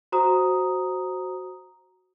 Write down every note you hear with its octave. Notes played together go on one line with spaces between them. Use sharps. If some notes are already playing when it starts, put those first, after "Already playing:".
F#4 C5 A#5 D#6